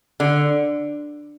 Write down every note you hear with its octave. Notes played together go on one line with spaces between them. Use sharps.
D3